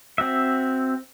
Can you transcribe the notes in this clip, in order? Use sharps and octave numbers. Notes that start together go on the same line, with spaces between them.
C4 F#4 E5